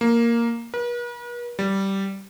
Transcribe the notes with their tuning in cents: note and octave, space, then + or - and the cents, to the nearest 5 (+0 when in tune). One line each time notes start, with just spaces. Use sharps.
A#3 +0
B4 -45
G3 -10